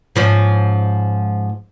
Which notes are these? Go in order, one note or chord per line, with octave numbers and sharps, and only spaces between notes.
G#2 F3 C#4